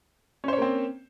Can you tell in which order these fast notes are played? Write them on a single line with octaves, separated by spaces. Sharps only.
C#4 C5 C#5 A#3 C4